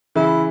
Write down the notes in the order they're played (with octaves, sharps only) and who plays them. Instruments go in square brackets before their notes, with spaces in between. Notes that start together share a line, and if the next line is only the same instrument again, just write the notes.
[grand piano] C#3 E3 [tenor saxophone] E4